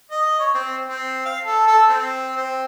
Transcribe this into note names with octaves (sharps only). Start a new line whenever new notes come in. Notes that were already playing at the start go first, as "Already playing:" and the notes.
D#5
C#5
C4
C4
F5
A4
A4
C4
C4